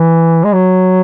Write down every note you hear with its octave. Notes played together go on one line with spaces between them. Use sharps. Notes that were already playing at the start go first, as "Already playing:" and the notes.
Already playing: E3
G#3
F#3